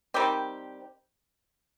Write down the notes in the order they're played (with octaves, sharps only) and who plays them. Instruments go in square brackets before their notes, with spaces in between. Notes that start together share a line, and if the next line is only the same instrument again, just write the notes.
[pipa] D#3 G3 C4 G4